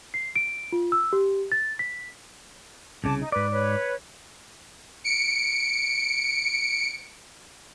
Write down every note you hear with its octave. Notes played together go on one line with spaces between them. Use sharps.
C7
D7
F4
E6
G4
A6
B6
C2 C#3 A5 D6
D#4
G#2 B4 D5
B4 C#5
C#7 D7